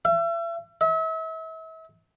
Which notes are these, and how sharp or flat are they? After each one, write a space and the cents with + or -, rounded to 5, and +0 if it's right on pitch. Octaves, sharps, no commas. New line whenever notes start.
E5 +35
E5 -40